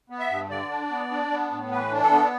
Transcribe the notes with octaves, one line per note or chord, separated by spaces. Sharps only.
B3
E5
G2
D3 D5
D4
B3
D4
B3
A2
E3 B4
D4
A4
B3